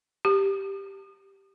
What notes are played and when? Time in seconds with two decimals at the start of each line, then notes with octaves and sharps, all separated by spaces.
0.25 G4